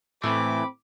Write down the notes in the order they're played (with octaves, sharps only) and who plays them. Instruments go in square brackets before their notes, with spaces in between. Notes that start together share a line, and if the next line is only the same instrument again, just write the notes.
[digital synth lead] A2 [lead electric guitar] E3 A3 [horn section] C4 B5 [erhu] D6